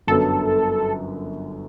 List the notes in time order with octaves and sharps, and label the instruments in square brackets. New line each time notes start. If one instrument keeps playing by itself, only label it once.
[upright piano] G1 F#2 D3 F#3 B3 [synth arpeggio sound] A4